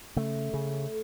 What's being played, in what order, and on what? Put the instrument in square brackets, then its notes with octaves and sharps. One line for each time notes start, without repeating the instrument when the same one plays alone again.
[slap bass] C#3 A3
C#3